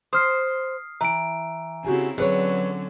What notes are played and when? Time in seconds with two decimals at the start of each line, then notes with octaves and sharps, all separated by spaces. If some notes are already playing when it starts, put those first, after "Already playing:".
0.13 C5 D#6 F6 C7
1.01 E3 A#5 D7
1.85 C#3 C4 E4 F#4 G4 G#5
2.18 D3 F#3 C4 C#4 G#4 B4 C#5